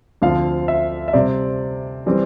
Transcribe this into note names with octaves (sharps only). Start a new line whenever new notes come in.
D2 D3 F3 C4 F5
E5
E5
C3 G3 C4 D5
E3 G3 C4